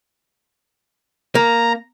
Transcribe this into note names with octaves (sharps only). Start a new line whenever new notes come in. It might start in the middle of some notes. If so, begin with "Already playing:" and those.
A#3 A#5